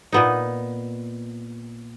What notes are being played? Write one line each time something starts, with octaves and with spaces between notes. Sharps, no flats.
A#2 B3 D#4